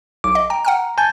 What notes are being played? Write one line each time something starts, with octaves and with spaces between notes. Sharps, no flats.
B1 D6
D#5
G5 A#5
F#5 G5 F6
G#5 A5 G6